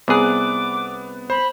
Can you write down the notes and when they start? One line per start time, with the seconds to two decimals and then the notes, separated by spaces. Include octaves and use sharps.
0.08 C2 B3 G#4 D6 F#6
1.30 C5 B5